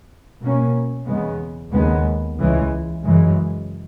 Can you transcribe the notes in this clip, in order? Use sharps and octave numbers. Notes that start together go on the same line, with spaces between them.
B2 A#3 C#4
E2 C#3 G#3 B3
D#2 C#3 G#3 B3
C#2 C#3 E3 G#3
F#2 C#3 E3 G#3